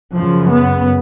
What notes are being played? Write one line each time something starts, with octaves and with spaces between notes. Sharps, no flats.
F#2 C#3 F3
B3